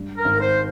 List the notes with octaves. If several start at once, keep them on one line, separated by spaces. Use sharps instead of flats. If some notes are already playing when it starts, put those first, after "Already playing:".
Already playing: G2
A#4
G#1
C5